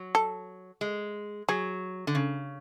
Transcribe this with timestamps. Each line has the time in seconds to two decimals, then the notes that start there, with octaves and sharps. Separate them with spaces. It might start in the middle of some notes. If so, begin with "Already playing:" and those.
Already playing: F#3
0.15 A4
0.81 G#3
1.48 F#3 G#4
2.07 D3
2.15 C#3